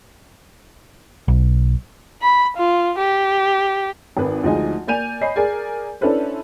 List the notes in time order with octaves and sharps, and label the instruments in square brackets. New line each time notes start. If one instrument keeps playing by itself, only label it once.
[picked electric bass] B1
[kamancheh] B5
F4
G4
[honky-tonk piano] G#1 D#3 B4
D2 F3 G#3 D#4 D#5 G#5
A#3 D5 G#5 G6 D#7 F7
C#5 D#5 G#5 B5 C7
G#4 A#4 D5 G#5
C#4 D4 E4 A4 B4 C5